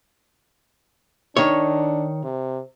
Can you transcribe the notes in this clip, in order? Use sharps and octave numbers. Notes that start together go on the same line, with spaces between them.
D#3 D4 C#5
C3